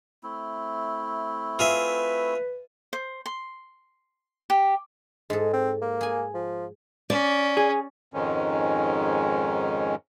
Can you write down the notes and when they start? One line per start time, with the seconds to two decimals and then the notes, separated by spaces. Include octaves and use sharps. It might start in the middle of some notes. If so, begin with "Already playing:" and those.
0.23 A3 C4 E4
1.59 F4 G#4 B4 E5
2.93 C5
3.26 C6
4.50 G4
5.30 G#2 G#3 A4
5.53 C4
5.82 A#3
6.01 G#4 G#5
6.34 F3
7.10 C#4 D5
7.57 G#4
8.14 F2 G#2 D#3 G#3 C#4